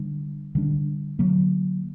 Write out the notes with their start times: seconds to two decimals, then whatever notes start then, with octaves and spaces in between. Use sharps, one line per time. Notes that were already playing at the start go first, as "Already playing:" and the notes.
Already playing: D3 G3 D4
0.55 D3 G3 D4
1.19 D3 F#3 A#3